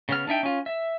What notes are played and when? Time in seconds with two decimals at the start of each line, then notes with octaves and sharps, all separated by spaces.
0.09 C#3 B3 F6
0.27 D4 D#4 E5 G5
0.43 C#4 F4
0.66 E5